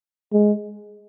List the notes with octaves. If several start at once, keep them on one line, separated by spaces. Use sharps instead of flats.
G#3